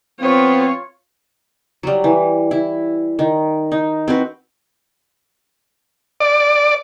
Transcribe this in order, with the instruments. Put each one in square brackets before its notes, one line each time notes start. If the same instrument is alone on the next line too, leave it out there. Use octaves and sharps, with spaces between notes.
[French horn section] F3 B3 C4 [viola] F4 C#5
[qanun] F#3 G3
E3
E4
D#3
D#4
C4 F#4 B4
[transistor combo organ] D5